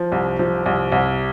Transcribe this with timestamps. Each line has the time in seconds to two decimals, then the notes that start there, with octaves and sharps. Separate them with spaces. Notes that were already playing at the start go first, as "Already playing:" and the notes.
Already playing: F3
0.12 C2
0.39 F3
0.66 C2
0.92 C2